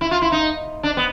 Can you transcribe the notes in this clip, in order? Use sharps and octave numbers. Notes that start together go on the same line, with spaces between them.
E4
F4
E4
D#4
D4
B3